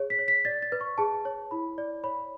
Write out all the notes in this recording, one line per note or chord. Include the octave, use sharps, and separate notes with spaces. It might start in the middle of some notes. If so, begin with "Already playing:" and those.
Already playing: G#4 C#5
B6
C#5
B6
D5 A6
A6
B4
C#6
G#4 A5
C#5
E4 B5
D5
C#5 B5